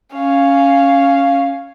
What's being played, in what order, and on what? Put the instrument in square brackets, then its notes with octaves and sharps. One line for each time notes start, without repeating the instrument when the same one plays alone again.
[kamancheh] C#4 F5